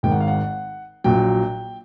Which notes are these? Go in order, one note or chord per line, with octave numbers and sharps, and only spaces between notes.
G#1 G#2 D#3 G5
F#5
F5
F#5
A#1 A#2 F#3 G5